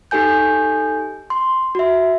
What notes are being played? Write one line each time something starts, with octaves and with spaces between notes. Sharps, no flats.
D#4 G4 A4 G#5 G6
C6
F#4 E5